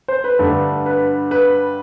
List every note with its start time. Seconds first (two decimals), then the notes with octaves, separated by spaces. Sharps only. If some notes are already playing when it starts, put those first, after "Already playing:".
0.08 C5
0.24 B4
0.39 G2 D3 A3
0.86 B4
1.31 B4